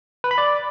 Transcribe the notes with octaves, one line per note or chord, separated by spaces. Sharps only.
B4
B5
D5